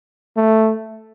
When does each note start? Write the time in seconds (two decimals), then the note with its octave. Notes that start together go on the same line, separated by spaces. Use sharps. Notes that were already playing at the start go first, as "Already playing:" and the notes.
0.37 A3